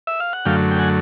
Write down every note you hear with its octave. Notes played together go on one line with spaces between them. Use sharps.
E5
F5
F#5
F#2 D3 F#3 A3 F5 G5
G5
F#5 G#5